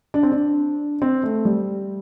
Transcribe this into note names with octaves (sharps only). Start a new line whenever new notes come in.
D4
C4
D4
C4
A3
G3